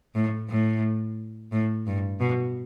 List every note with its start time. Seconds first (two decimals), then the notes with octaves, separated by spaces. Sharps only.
0.15 A2
0.49 A2
1.52 A2
1.87 G2
2.20 B2